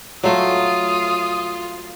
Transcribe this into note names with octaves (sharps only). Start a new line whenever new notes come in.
F#3 A3 F4 D#6